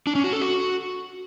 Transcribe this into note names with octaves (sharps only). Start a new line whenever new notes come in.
D4
C#4
F#4
A4
F#4